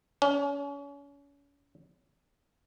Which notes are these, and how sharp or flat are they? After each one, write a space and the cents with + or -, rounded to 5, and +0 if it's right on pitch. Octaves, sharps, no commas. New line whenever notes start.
C#4 +35